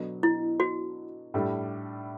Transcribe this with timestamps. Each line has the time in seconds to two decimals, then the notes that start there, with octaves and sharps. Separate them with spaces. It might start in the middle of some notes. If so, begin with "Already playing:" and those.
Already playing: B2 F#3 B3 D4 A4
0.23 E4
0.60 F#4
1.34 A2 G3 D4 A4